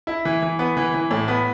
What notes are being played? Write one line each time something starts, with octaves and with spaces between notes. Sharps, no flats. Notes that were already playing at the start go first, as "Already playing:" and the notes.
E4
E3
E3
B3
E3
E3
A2
B3